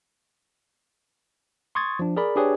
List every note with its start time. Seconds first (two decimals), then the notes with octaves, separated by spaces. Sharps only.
1.75 C6 C#6 D#6 G#6 A6
1.99 F3 D4
2.16 G#4 A#4 D5 B5
2.36 D4 G4 G#4 B4 C#5 D5